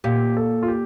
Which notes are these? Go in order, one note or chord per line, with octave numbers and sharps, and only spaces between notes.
A#2 G4
A4
F4
G4